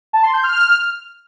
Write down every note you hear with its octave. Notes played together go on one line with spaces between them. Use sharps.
A5
C6
G6
F6